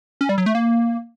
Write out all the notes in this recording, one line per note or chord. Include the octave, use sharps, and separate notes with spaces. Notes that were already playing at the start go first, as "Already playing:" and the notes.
C#4
G3
F#3
A3
A#3